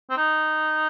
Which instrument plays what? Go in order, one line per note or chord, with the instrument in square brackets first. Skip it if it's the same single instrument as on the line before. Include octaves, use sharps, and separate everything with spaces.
[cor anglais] C4
D#4